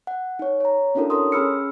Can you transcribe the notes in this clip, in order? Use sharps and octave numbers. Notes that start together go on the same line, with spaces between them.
F#5
D#4 C#5
C#5 A#5
C#4 D4 E4 F#4 A4 A#4
A4 A#4 C#5 C6 D#6
C#4 G#4 B5 E6 F6 C#7